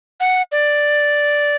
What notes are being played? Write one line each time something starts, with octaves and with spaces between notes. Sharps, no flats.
F#5
D5